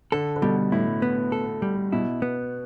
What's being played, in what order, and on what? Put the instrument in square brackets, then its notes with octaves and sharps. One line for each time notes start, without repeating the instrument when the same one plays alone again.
[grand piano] D3 [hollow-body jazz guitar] A4
[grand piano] D3
[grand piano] B2 [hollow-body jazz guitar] G3
[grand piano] A2 [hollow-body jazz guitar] E4
[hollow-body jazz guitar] B3
A4
G3
[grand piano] B2 [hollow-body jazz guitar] E4
[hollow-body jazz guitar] B3